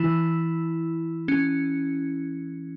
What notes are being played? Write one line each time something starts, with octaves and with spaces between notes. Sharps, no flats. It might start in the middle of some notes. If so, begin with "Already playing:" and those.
Already playing: E3 E4
C#4